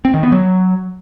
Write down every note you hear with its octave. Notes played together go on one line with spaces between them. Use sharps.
C4
D#3
B3
F#3